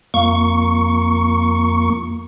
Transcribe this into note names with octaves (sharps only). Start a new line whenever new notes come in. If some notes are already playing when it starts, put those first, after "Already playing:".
F2 A#3 C#6